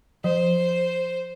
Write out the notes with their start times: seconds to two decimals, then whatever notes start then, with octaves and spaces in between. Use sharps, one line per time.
0.24 F3 C5